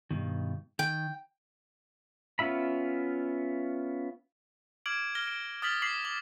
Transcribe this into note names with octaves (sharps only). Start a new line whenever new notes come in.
G2 B2 D#3
D#3 G5
B3 C#4 F4 E5 B5
D6 F6 G#6 D7 F#7
F6 A#6 G7
D7
D#6 F6 A6 B6 F#7 G7
D6 B6 C7 F#7
D6 F#7 G7